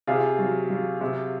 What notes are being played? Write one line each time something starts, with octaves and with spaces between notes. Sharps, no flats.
C3 F4 G#4
F#3
F#3
C3